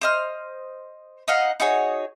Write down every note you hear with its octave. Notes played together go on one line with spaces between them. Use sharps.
C5 D#5 F6
D#4 D#5 F5 F#5
D#4 F#4 G#4 C#5